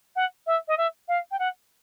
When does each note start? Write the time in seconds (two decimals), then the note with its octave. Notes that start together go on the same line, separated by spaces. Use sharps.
0.15 F#5
0.46 E5
0.68 D#5
0.77 E5
1.08 F5
1.31 G5
1.39 F#5